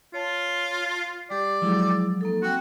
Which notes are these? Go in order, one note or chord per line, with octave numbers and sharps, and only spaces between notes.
F4 C#5 A5
C7
G3 G4 D5
F3 F#3 G#3 E4 G#4
A#3 D#4 A4
C4 F#4 G5